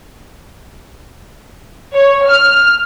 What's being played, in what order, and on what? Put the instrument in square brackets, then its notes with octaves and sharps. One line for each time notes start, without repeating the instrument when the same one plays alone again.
[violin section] C#5
F6